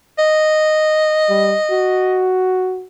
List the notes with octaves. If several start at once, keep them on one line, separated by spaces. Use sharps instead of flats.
D#5
G3
F#4